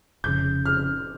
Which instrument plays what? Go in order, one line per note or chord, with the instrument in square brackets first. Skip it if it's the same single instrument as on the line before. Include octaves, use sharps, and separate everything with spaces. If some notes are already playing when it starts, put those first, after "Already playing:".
[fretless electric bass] F1 F2 C#3 [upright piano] G6
[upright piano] F6